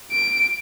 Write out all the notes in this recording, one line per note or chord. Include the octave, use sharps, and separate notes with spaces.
D7